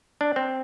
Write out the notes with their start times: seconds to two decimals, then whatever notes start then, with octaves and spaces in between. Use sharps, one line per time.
0.21 D4
0.36 C4